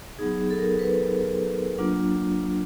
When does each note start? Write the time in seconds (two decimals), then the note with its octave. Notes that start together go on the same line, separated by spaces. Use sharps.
0.19 F#3 B3 D#4 G#4
0.51 A4
0.59 A#4
0.79 B4
1.79 F#3 A#3 D4 F4